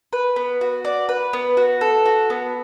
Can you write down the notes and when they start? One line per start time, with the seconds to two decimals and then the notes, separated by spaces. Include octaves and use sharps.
0.13 B4
0.36 B3
0.61 F#4
0.85 D5
1.09 B4
1.33 B3
1.57 F#4
1.81 A4
2.06 F#4
2.30 B3